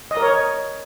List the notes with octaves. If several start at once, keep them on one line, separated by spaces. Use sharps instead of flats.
D#5
A#4
C#5